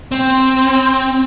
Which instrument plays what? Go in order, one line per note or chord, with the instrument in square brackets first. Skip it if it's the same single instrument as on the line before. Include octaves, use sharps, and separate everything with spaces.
[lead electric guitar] C4